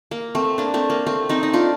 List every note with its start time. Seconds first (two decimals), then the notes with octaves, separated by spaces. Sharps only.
0.11 A#3
0.35 A3 C4
0.58 A#3 D4
0.74 A3 C4
0.90 A#3
1.07 A3 C4
1.29 C4 D#4
1.43 D#4
1.53 D4 F4